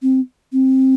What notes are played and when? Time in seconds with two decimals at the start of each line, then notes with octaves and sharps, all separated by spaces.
0.02 C4
0.53 C4